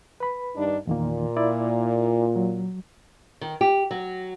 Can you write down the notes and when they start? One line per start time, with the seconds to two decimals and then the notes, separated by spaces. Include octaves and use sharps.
0.20 B4 B5
0.55 G2 D#3 D4
0.87 E2 A#2 D#3 A#3
1.37 E4 D5
2.36 F#3
3.41 D#3
3.61 G4
3.91 F#3